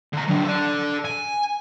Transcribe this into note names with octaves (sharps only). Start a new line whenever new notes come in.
D3 A#5
F#3 D4
A4 D5
G#5